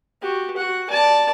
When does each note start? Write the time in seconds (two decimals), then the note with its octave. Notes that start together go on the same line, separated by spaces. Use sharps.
0.22 F#4 G4
0.57 F#4 F#5
0.90 D5 A5